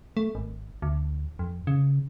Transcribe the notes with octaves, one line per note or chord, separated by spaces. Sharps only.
A3
G#1
D2
F2
C#3